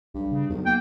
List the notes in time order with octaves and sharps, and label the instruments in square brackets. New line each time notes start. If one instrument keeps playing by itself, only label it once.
[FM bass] B1 [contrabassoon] G2
[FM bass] C#3
[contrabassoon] B1 [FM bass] E2
[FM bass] A#3 [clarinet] G5